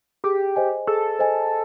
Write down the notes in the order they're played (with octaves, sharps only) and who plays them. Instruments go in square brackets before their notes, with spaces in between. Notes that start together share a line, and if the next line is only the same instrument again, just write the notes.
[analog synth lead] G4 [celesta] G#4
[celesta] C5 D#5 G#5
[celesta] G#4 [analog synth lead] A4
[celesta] C5 D#5 G#5